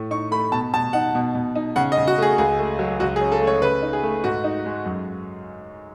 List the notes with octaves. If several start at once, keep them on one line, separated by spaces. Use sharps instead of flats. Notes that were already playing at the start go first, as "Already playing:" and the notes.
Already playing: A2 A3
D#4 C#6
A3 B5
B2 A5
B2 A5
D#4 F#5
B2
B2
D#4
C#3 F#5
D#5
C#3
F#4
A3 G#4
C#2 G#4
A3
F#3
C#2 F#4
G#4
C#4
A4
A3
C#5
C#3 B4
D#4
G#4
A3
G#2 F#4
D#4
G#3
F#2